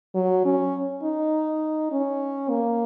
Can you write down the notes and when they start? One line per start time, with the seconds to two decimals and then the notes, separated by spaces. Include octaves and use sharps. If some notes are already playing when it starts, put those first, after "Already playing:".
0.15 F#3
0.45 C#4
1.03 D#4
1.92 C#4
2.49 A#3